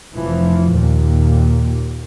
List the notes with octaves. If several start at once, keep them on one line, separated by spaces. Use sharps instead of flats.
F1 E3 F3
D#2 A#2